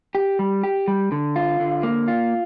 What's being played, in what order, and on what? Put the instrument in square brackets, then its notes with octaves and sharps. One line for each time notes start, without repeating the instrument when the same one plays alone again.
[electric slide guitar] G4
G3
G4
G3
D3
F4
D3
A#3
F4